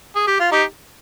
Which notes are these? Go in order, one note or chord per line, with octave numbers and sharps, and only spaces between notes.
G#4
G4
F4
D#4 G4